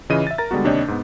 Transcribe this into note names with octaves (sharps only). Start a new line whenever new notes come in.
C#3 E3 F4 D#5 D#7
E5 A6
A#4 A#5 A6
D3 G3 G#3 B3 F#4
D#2 C3 D4 C#5 D#5 G6
G#2 B3